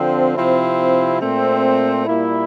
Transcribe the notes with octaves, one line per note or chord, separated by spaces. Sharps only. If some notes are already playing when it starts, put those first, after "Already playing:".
Already playing: D3 F3 C4
C3 F3 C4 E4
A#2 A3 C4
A#2 G3 A#3 E4